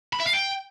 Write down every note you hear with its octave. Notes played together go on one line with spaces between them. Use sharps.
B5
E5
F5
G5